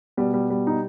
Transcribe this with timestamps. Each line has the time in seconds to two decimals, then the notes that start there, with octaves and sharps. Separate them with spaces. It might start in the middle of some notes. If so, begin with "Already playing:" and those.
0.17 B2 G3
0.34 G3
0.50 G3
0.67 D#4